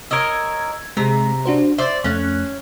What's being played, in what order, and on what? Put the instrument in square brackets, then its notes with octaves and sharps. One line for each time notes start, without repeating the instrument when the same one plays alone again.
[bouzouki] A#4 C#5 D#5 [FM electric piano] E6 G#6
[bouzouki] C3 A#5 [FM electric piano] G#3
[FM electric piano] D4 F#4 C5
[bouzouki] C5 D5 [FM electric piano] E5
[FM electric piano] F2 A3 F#6 [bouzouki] C#4